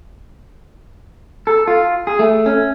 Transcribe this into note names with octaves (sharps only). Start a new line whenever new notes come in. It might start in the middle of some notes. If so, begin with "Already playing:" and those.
A4
F4
G#4
A3
C#4